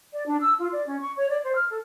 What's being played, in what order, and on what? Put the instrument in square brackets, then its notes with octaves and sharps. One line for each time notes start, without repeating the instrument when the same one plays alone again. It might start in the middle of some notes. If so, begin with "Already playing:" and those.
[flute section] D5
D4
E6
F4
D5
C#4
C#6
C#5
D5
C5
F6
A4